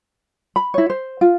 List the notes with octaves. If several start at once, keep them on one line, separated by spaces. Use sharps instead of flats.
B5
E4 C#5
C5
F4